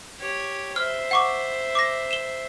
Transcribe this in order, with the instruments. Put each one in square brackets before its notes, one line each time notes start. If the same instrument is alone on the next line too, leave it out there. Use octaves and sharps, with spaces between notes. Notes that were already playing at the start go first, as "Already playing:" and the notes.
[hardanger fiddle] G4 C#5
[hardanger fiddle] C5 E5 [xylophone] F6
[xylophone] F#5 C#6 D6
D6 A#6
E7 G7